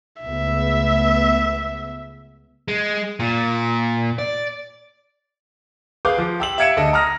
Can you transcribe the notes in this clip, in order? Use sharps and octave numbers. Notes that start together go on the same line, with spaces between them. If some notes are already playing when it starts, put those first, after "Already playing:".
C#2 A3 B3 E5
G#3
A#2
D5
G#4 B4 F5 D6 G6
F3
G4 E6 F#7
E5 F5 G#6 C#7 D7 E7
D2 A4 D#5
A#5 D#6 F6 A#6